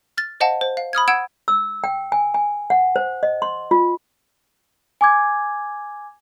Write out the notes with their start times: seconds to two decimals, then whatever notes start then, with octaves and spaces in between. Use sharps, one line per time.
0.17 F6 A6
0.40 C5 D#5 F5 F#5 A5
0.61 C5
0.77 F5
0.93 B5 D#6 F6 G#6
1.08 F#5 E6 G#6 D7 E7
1.48 E6
1.84 G5
2.12 G#5
2.34 G#5
2.70 F#5
2.96 C5
3.23 D#5
3.42 C6
3.71 F4
5.01 G#5 D6 G#6